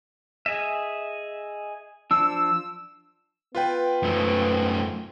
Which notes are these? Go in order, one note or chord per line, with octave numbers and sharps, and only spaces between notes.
G#4 D#5 E5
F3 D4 E6
B3 F4 B4 G5
F#2 A3